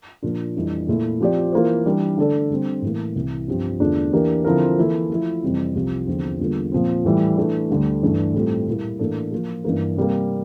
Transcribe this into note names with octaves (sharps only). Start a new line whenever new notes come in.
A#2 F3 A#3 D4 F4
F2 E3 G3 D4
A#2 A3 E4
F3 C4 G4 D5
E3 A#3 F4 C5
E3 G3 D4
D3 A3 D4 A4 D5
D3 G3 C4
A2 E3 A#3
C2 C3 E3
G2 F3 C4 G4
E2 D3 A3 D4 F4
E3 A#3 D4 G4 A#4
D3 F3 C4 E4 A#4
E3 A#3 E4 A4
F3 A3 E4
F2 C3 E3 G3 C4
C2 C3 F3 C4 G4
E2 D3 F3 C4
E2 D3 G3 A#3 F4
A#2 F3 C4
A2 E3 G3
E3 A3 D4
D2 D3 G3
G2 E3 A3 D4
A2 G3 C4 F4 A4
A#2 G3 A#3 E4
A2 E3 A#3 D4 A4
F3 A#3 F4
G2 E3 A#3
C3 G3 A#3